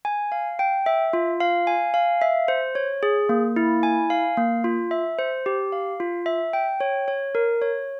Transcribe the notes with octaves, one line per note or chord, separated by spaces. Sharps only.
G#5
F5
G5
E5
F4
F5
G#5
F5
E5
C5
C#5
G#4
A#3
E4
G#5
F5
A#3
F4
E5
C5
G4
F5
F4
E5
G5
C#5
C#5
A#4
C#5